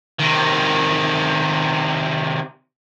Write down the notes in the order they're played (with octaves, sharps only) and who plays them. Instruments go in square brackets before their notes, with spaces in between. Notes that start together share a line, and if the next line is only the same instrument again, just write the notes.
[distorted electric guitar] C3 D#3